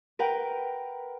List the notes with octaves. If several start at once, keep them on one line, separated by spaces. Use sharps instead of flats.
A#4 B4 F#5 G5